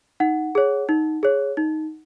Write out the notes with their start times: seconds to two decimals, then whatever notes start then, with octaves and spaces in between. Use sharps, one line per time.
0.20 D#4 F#5
0.55 G#4 C#5
0.89 D#4
1.23 G#4 C#5
1.57 D#4